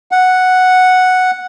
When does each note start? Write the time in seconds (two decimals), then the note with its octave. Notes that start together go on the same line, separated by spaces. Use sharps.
0.11 F#5